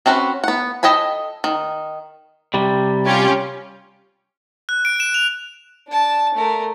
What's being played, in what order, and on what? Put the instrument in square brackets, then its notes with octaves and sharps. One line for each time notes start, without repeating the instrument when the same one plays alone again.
[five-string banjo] C4 C#4 F#4 A4 B4
B3 F#5
A4 D#5 G5 G#5 B5
D#3
[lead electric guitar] C3 G3
[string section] C#4 F4 G4
[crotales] F#6
D7
E7
F7
[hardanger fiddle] D4 A5
A3 A#4